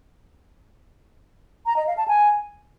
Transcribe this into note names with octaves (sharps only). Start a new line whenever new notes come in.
A#5
D#5
F5
A5
G#5